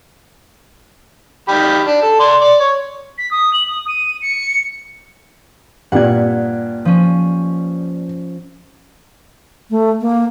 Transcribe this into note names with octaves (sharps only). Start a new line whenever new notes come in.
D#3 G4 B5
D4
A4
D5 C6
D5
C#5
B6
D#6
F#7
D#6
D#7
C#7
G2 A#2 F#5 G#6
F3 C#4
A3
A#3